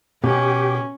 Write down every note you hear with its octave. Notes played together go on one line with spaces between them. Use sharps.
B2 C#4 G4